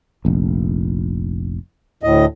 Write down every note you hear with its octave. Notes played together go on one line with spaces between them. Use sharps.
F1 A#1
D2 A2 D#5